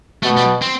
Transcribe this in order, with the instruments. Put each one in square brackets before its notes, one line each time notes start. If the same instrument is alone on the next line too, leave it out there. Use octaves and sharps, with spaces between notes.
[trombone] B2 [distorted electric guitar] A3
[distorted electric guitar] G3
C4